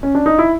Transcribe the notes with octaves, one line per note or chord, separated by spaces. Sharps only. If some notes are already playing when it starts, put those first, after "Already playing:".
C#4
D4
D#4
E4